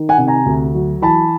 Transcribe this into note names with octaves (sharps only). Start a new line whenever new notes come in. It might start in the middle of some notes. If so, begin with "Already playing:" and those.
Already playing: D#3
F#5 G#5
C3
G#5 A#5
D2
F#3
E3 A5 B5